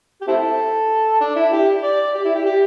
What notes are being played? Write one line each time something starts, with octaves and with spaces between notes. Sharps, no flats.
G4
C4 E4 A4
D4
E4
G4
D5
G4
E4
G4
G4